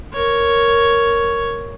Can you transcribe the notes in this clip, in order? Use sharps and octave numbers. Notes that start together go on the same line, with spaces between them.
A#4 C#5